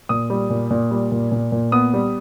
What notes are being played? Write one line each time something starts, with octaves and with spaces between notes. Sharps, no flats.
A#2 D#6
G3
A#2
A#2
G3
A#2
A#2
A#2
B3 D#6
G3